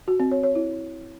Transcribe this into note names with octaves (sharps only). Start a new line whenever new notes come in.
F#4
C4
C#5
C#5
E4